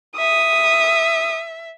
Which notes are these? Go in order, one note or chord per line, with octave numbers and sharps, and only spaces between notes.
E5 D#6